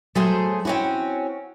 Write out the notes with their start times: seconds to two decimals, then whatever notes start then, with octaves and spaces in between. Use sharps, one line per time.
0.15 F#3 A3 G#4 C5
0.65 C4 C#4 E4 F#4